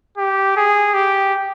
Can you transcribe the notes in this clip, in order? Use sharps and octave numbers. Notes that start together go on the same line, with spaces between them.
G4
G#4
G4